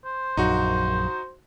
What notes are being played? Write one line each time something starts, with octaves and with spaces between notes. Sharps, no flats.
C5
A#1 F#2 F#3 D#4 F#4